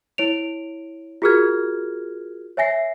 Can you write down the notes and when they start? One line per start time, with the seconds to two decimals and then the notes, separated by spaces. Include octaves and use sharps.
0.18 E4 C#5 D7 F7
1.22 F4 F#4 G#4 A#4 F6 G#6
2.57 C#5 E5 G#5 A#6 C7